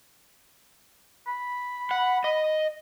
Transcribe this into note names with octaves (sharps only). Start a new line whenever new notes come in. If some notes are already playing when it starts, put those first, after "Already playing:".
B5
F#5
D#5